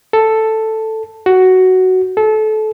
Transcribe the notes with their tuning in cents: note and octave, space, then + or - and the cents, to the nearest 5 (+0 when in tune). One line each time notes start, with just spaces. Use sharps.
A4 +5
F#4 +10
A4 -25